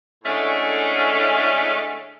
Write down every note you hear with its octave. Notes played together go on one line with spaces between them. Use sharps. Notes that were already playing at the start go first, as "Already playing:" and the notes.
A2 D3 G#3 A3 C#4